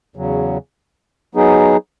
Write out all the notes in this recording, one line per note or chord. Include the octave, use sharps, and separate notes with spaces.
E2 C#3 F#3
F#3 B3 D#4 G#4